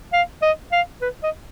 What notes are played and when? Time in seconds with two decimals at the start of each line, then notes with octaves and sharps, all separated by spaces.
0.13 F5
0.42 D#5
0.72 F5
1.02 B4
1.23 D#5